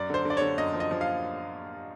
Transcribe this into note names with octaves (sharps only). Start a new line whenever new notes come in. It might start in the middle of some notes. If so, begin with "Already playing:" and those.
Already playing: F#2 D5
D3 C5
D3
D5
D3 C#5
F#2 D#5
F3
D#5
F3
F5